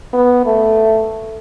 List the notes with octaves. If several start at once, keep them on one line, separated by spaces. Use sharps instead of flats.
B3
A3